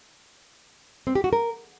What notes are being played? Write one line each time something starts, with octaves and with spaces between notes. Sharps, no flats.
C4
G4
F#4
A#4